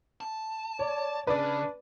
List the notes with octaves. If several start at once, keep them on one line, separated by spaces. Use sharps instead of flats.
A5
C#5 D5
C#3 D4 B4 D5